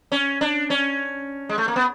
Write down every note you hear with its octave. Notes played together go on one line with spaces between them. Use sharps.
C#4
D4
C#4
G#3
A3
A#3
B3